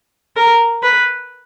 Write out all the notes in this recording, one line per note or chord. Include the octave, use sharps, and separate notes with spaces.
A#4
B4